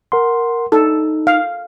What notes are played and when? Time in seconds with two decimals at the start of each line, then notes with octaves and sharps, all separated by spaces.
0.12 A#4 F#5 C6
0.72 D#4 A4
1.27 F5